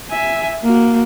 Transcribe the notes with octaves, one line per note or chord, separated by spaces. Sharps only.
E5 G#5
A#3 F#4